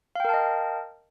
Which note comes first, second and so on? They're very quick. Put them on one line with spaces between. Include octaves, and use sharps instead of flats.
F5 G5 A#4 A5 D#5